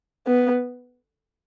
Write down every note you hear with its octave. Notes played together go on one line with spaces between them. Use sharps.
B3